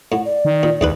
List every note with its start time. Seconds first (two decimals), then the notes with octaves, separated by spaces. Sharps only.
0.12 A2 F#5
0.25 D5
0.45 D#3
0.63 A#2
0.81 D#2 G#2 D4 B4